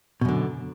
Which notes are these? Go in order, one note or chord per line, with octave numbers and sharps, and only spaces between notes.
F#2 B2 D3